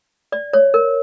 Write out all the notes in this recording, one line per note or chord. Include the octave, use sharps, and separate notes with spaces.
D5
C#5
A#4